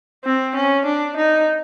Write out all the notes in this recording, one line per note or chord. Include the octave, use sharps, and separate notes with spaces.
C4
C#4
D4
D#4